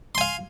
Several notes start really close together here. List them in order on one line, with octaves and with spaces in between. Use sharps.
C6 G#5 F5